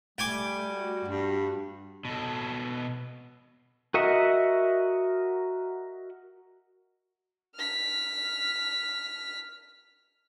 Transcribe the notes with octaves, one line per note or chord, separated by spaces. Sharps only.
G3 A3 G5 G#5 D6
F#4
G2
B2 A4
F#4 A#4 D#5 E5 F#5
F6 B6